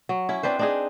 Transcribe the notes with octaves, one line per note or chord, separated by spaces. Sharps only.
F#3
C#4 E4
C4 D4 B4 C5
D4 D#4 G#4